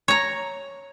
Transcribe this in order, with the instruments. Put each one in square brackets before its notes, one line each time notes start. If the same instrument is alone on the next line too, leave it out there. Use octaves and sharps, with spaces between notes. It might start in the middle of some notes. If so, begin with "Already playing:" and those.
[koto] C#5 A#5